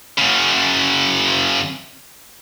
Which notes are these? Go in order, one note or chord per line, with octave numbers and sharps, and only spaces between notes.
F#2 C#3